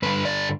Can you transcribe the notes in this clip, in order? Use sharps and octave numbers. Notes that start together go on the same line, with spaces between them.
G2 D3 G3 B4
D5